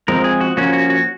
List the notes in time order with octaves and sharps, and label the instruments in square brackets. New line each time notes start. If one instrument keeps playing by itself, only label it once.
[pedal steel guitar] F3 G#3 C4 A#4
G#4
F#4
F3 A#3 C#4 F#4
F#4
F#4